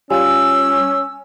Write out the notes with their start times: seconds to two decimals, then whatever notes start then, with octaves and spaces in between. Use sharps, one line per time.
0.10 G3 C#4 F4 C#5 G#5 E6